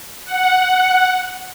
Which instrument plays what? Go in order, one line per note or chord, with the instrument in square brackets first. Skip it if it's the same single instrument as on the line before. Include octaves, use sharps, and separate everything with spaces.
[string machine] F#5